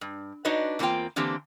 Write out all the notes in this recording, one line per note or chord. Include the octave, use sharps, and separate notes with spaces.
G2
D4 D#4 F#4 B4 C#5 D#5
E2 E3 A#3 C4 F4 G5
D3 E3 A#3 C4 D4 G4